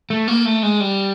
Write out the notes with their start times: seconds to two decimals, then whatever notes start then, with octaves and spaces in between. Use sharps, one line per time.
0.10 A3
0.28 A#3
0.45 A3
0.63 G#3
0.80 G3